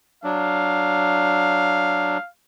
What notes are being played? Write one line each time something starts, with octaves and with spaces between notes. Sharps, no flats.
F#3 D4 F5